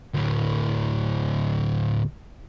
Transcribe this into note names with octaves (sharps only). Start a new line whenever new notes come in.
D2 A2